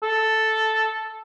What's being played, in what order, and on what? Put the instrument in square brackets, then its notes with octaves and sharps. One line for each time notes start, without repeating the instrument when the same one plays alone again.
[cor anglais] A4